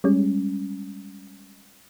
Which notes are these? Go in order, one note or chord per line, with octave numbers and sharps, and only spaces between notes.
G3 G#3 C#4